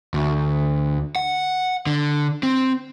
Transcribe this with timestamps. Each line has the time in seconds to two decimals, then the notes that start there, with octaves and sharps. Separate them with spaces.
0.14 D2
1.16 F#5
1.87 D3
2.43 C4